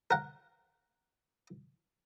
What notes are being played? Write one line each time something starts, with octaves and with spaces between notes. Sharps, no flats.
A#4 F#5